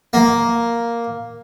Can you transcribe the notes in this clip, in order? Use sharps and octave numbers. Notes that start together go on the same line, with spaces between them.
A#3